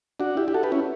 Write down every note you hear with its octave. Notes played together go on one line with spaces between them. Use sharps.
D4 F#4
E4 G4
G4
F#4 A4
G4 B4
C#4 E4